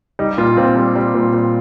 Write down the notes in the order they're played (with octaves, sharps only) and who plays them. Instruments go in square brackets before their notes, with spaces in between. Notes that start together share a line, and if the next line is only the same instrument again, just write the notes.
[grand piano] G3 D#4
A#2 F4
A#2 C4
G3 C4
G3
A#2
A#2